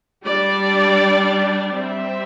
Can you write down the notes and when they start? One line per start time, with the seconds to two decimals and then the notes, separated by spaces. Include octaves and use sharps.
0.25 G3 D4 D5
1.75 G3 C4 E5